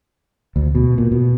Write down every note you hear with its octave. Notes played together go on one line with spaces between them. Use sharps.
D2
B2
A#2
B2